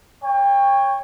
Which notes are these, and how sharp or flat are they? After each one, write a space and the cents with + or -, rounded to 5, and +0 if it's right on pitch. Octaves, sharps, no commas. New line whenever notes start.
C#5 +0 G5 +30